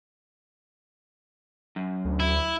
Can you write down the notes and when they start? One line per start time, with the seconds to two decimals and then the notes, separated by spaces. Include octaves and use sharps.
1.76 F#2
2.05 D2
2.20 E4